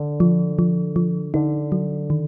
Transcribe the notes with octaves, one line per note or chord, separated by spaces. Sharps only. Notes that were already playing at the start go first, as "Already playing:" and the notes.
Already playing: D3
F3
F3
F3
D3 D#4
F#3
D#3